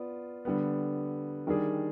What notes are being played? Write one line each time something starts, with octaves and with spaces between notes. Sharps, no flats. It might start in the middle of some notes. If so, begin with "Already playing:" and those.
Already playing: B3 F4 D5
D3 G3 B3
D#3 G3 D4 G#4